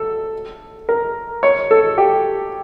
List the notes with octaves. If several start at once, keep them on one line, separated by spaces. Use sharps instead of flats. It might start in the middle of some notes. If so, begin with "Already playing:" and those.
Already playing: A4
A#4
C#5
A4
G4